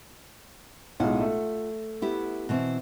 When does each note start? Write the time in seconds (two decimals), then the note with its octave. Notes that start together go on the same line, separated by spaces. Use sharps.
1.00 B1 A2 G#3 F4 F#5
1.21 A3
2.02 B3 E4 G4
2.49 B2 E3 C4